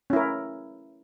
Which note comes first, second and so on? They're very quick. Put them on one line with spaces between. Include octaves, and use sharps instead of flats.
C#4 E4 A#4